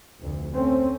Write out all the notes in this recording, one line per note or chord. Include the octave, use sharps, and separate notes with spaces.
F1 D2
A3 C4 C#4